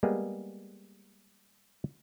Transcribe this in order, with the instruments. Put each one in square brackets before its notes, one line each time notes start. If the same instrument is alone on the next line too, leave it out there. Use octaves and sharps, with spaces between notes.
[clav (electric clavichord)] G3 G#3 A#3 B3 G#4